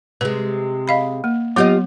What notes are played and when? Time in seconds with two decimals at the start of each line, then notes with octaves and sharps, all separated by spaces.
0.21 C3 G#3 B4
0.88 D#5 F5 B5
1.24 A#3
1.56 F#3 B3 F4 G4 D#5